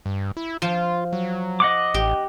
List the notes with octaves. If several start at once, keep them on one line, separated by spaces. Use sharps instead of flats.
G2
E4
F3 F4
F#3
D#5 F#5 D6
A1 G4